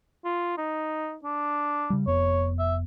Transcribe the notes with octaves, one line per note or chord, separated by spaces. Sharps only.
F4
D#4
D4
C#3 G3
F1 F2 B3 C#5
E5